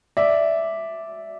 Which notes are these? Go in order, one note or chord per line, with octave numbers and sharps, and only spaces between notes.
D5 E5